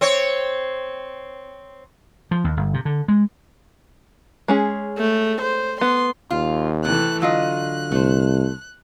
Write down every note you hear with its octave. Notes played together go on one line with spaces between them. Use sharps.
C4 C#5
F3
D#2
G1
C3
D3
G#3
G#3 C#4 G#4
A3
C5
B3 C6
D#2 F4
C3 E3 A3 F#6
D3 F#3 F4 D#5 F#6
C2 A3 C5